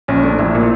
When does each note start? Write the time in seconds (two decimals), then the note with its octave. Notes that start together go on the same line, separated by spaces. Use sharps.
0.08 A#1 C#4
0.23 A3 D4
0.39 A#1 E4
0.55 A#2